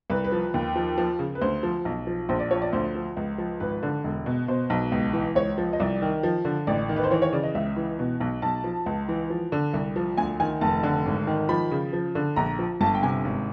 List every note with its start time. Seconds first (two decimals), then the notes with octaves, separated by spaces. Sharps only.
0.10 C2 B4
0.24 B4
0.32 F3
0.54 D#2
0.76 F3
0.98 F3
1.19 C#3
1.35 B4
1.41 D2 C5
1.63 F3
1.85 B1
2.07 F3
2.29 A#1 C5
2.40 D5
2.51 F3 C#5
2.62 D5
2.73 D2 C5
2.95 F3
3.17 C#2
3.38 F3
3.60 G#1 B4
3.83 D3
4.04 E1
4.26 B2
4.48 B2 C5
4.70 B1
4.92 C#2
5.13 E3
5.35 C#2 C#5
5.58 F3
5.73 D#5
5.80 C2 D5
6.02 D#3
6.23 F3
6.45 D3
6.67 A1 D5
6.89 D#3
6.96 B4
7.04 C5
7.11 E3 C#5
7.22 C#5
7.33 C#3 D5
7.43 D#5
7.55 C#2 E5
7.76 E3
7.99 B2
8.21 B1
8.42 B1 A5
8.64 F3
8.86 C#2
9.09 E3
9.30 F3
9.52 D3
9.74 C2
9.96 F3
10.17 D2 G#5
10.40 D#3 G#5
10.61 F1 A5
10.83 D3
11.06 G#1
11.27 D#3
11.49 F3 B5
11.71 C#3
11.93 F3
12.15 D3
12.36 A#1 A#5
12.59 F3
12.81 G1 A5
12.95 G5
13.03 C3 G#5
13.24 G#1